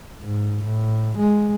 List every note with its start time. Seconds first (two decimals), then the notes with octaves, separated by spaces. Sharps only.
0.23 G#2
0.65 A2
1.19 G#3